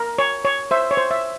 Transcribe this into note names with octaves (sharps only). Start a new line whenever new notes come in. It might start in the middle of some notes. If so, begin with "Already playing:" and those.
Already playing: A#4
C#5
C#5
C5 E5
C#5
C5
E5